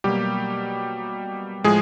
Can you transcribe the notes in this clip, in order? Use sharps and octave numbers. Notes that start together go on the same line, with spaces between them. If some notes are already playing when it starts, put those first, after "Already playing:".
B2 F#3 G3 A#3 G4
A2 F3 G#3 G#4